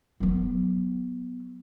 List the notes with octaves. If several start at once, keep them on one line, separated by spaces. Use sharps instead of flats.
F#3 B3